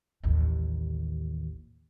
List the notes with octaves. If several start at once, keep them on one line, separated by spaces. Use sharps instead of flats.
A1 D#2